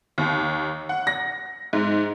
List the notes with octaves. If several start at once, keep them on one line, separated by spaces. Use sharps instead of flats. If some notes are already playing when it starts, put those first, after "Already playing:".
D#2
F#5
A#6
G#2